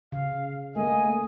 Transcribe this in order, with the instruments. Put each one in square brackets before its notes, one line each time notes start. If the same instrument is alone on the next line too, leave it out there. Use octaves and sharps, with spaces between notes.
[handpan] C#3 [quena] F5
[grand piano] A3 [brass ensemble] A#3 D#5 [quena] G#5